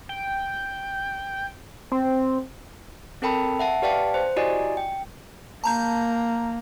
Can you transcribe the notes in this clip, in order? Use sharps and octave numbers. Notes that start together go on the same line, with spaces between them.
G5
C4
C4 A4 A#4 G5 A5 B5
E5 F#5 A5
G4 B4 D5 F5 G5 A5
C5
E4 F#4 G4 D5 D#5 G#5
G5
A#3 A5 A#5 G6